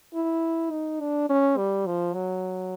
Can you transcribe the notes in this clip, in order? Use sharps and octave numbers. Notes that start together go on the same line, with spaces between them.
E4
D#4
D4
C#4
G3
F3
F#3